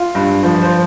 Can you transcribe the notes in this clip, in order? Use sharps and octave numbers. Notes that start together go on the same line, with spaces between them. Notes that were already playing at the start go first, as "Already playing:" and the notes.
Already playing: F4
G2
F3
C5